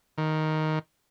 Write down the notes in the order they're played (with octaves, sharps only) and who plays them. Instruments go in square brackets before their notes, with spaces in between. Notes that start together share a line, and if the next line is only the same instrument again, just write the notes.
[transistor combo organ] D#3